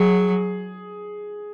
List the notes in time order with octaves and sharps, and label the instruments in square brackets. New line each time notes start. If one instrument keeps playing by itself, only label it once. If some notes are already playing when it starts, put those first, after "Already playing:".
Already playing: [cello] F#3 [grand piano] G#4